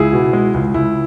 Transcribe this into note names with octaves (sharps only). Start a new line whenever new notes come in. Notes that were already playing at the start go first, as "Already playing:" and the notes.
Already playing: C#2 E4 G#4
B2
G#3
C#2
C#2 E4